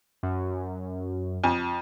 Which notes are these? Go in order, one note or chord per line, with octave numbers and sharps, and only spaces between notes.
F#2
F2